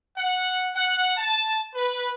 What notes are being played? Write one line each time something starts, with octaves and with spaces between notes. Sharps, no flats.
F#5
F#5
A5
B4